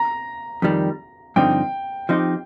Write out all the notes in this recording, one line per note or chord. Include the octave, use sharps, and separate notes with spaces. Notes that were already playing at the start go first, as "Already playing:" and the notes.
Already playing: A#5
F2 D#3 G3
G2 D3 F3 C4 D#4 G5
F3 C4 D#4 G4